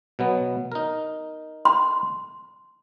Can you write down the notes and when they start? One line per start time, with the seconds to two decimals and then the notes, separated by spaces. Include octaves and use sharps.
0.19 B2 F#3 B3
0.72 D#4 A#4
1.65 C6